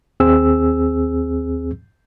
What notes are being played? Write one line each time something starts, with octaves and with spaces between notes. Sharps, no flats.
D#2 C4 G#4 E6